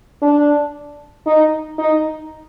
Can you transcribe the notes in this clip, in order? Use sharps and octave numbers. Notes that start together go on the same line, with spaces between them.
D4
D#4
D#4